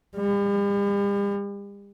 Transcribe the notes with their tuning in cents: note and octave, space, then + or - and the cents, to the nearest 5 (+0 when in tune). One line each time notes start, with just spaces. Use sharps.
G3 +45